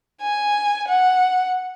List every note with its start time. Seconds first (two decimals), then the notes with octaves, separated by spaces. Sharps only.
0.22 G#5
0.88 F#5